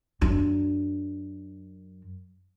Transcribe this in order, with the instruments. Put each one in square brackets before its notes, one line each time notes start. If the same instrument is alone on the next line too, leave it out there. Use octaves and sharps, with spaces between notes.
[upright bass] F#2 D4